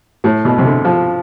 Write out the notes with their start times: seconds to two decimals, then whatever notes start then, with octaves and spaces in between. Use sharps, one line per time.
0.24 A2
0.45 B2
0.58 C3
0.64 D3
0.85 F3